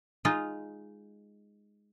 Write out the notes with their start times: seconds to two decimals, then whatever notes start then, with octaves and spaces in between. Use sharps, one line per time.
0.25 G#3 D#4 F4